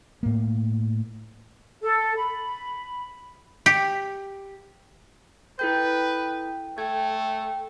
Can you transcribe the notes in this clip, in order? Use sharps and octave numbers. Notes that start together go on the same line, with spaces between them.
A2 A#3
A4
B5
G4
E4 A4 B4 G5 G6
A3 A4 G5 G#6